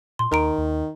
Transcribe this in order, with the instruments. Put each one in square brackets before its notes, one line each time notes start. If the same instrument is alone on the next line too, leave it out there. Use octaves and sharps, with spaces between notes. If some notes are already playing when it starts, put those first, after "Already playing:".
[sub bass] A#2 [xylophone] C6
[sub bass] D#2 [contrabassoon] D#3 [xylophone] A#4 A#5 D7
[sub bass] D#2